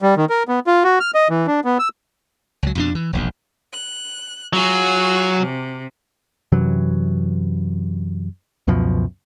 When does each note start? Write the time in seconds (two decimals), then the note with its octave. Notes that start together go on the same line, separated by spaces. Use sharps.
0.02 G3
0.17 D#3
0.30 A#4
0.48 B3
0.67 F4
0.84 F#4
1.00 F6
1.15 D#5
1.30 E3
1.47 D4
1.65 B3
1.79 E6
2.63 C#2 F#3
2.75 F2 B2 D4
2.95 E3
3.13 E1 A#1 D#2
3.72 F#6
4.53 F#3 F4 F#4 G#4
5.38 C3
6.52 F#2 C3 E3 F#3
8.67 C#2 F#2 B2 F3